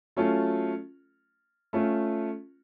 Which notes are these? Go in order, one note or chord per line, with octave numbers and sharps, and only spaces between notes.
F#3 A3 C#4 F4 A4
A3 C#4 F4